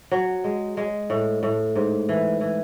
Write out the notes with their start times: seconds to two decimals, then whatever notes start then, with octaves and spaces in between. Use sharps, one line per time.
0.11 F#3
0.44 G#3
0.77 G#3
1.10 A2
1.43 A2
1.75 G#2
2.09 E3
2.41 E3